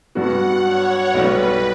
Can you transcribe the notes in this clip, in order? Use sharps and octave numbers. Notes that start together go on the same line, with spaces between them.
G2 F#3 B3 F#4 F#5
C#5
B1 B2 G3 B4